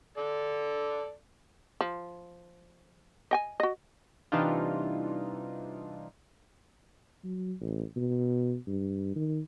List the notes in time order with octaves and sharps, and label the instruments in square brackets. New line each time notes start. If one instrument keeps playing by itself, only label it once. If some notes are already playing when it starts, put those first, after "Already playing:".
[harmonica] A4 D5
[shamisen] F3
D#5 G5 G#5
F#4 D#5
[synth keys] C3 E3 G3 D4 D#4 F4
[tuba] F#3
A1
B2
G2
D#3